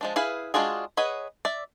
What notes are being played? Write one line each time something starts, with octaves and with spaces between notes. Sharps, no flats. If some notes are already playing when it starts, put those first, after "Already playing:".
F3 G#3 D4
E4 G#4 B4 F5
G#3 D4 F4 F#4 G#4
G#4 B4 C#5 D#5 F#5
D5 E5